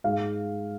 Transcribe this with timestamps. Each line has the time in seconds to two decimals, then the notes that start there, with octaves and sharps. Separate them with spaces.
0.04 G#2 F5